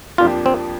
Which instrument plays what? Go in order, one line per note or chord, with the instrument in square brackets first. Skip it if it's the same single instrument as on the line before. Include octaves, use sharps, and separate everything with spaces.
[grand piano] F2 F3 A#3 D4 G4 [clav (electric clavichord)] F4
[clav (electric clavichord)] C4